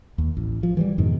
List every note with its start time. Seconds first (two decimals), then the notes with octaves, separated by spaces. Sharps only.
0.18 D#2
0.37 A1
0.63 F3
0.77 E3 F#3 G3
0.98 F2 G#2 B2 D#3